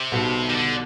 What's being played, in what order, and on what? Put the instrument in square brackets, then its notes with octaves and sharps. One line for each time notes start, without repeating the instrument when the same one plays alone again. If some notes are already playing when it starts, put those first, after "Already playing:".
Already playing: [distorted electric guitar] C3
[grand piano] B1 B2 G3 B3
[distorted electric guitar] D#3
D3